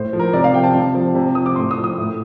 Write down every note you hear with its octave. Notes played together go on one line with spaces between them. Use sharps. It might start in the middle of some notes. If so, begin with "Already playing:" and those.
Already playing: A2 C5
F3
A#4
C3 D5
F5
F3 G5
A5
C3
F3
C3
F3 D#6
D6
A2 C6
D#6
F3
D#6
A2